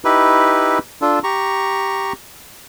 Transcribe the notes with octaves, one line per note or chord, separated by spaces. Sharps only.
D#4 E4 G4 B4
D4 F4 A4
G4 A#5 C#6